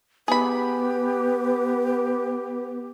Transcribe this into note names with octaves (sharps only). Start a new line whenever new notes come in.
B3 G4 G#4 B4 B5